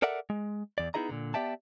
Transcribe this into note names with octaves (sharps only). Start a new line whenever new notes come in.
A4 A#4 D5 E5 F#5
G#3
E2 D5
B3 D#4 E4 G#4 D#5 A#5
A#2 D3
B3 G4 D5 E5 G5 A5